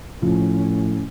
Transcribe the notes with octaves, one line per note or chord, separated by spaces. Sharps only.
A2 F3 C#4